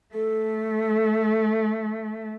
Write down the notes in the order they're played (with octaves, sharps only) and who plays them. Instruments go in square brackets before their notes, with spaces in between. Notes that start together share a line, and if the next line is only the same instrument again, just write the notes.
[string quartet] A3 [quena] A4